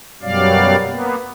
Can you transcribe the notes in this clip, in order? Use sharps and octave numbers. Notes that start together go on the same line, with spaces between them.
F#2 B2 F#3 G3 D5 F5
A#3 B3